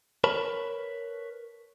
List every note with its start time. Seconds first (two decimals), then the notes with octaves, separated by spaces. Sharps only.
0.24 A#4 B4 C#5 A5 B5